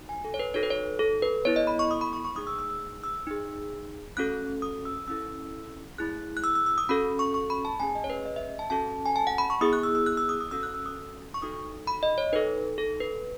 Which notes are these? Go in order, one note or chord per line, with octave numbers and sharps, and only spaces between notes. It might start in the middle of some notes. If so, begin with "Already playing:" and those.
Already playing: D#4 F#4
G#5
A4
C#5
B4
D#4 F#4 A4 C#5
B4
C#5
A4
B4
B3 E4 A4 C#5
D#5
B5
C#6
D#6
B5
C#6
C#6
A3 D#4 G#4 D#6
E6
E6
E6
E6
D#4 G#4
A3 C#4 F#4 A4 F#6
D#6
E6
C#4 E4 A4 E6
A3 E4 G#4 F#6
F#6
E6
E6
E6
D#6
C#4 F#4 A4 B5
C#6
C#6
B5
A5
A3 C#4 G#4 G#5
D#5
C#5
B4
D#5
E5
A5
C#4 F#4 A4 A5
G#5
A5
F#5
B5
C#6
B3 E4 G#4 D#6
F#6
E6
E6
F#6
E6
D#6
D#6
C#4 F#4 A4 E6
F#6
E6
D#6
C#6
D#4 F#4 A4 D#6
B5
D#5
C#5
D#4 A4 B4
A4
B4